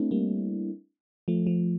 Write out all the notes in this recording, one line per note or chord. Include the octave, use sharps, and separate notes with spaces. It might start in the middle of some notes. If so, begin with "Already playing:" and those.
Already playing: A3 C4 D4 E4
G3 A#3
F3 A3
F3